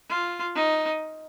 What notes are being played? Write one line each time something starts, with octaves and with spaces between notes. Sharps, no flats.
F4
D#4